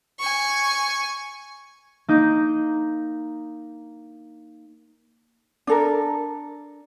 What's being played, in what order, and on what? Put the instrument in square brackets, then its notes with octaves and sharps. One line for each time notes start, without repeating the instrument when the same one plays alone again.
[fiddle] G#5 C#6
[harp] A#3 D#4 G6
[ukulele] D4 A4 A#4